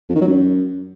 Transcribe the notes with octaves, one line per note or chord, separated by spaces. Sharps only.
F2
D#3
F#3
F#2